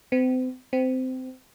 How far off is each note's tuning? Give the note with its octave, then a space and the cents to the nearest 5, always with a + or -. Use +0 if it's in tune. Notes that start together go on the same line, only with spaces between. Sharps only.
C4 -40
C4 -20